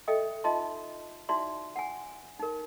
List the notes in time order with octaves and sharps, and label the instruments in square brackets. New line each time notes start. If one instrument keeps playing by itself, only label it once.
[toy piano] A4 D#5 E5 G5 D#6
D#4 F4 D#5 E5 A5 C6
D#4 E4 F#4 D5 E5 C6
F#5 G#5
D#4 A#4